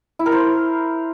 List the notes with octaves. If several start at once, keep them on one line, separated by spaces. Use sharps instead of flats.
E4
A#4
C5